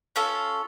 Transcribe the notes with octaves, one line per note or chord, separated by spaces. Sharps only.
C#4 F4 A4